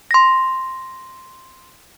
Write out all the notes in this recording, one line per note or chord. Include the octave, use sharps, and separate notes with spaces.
C6 A#6